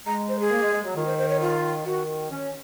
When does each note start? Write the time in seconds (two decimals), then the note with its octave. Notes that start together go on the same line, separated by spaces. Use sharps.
0.06 G#3 A#5
0.29 C5
0.40 G#4
0.51 A#3
0.62 G#3
0.73 G#3
0.84 F#3
0.95 D#3 F4
1.06 C5
1.18 C5
1.29 C#5
1.40 F4
1.85 D#3 F#4
2.30 C#4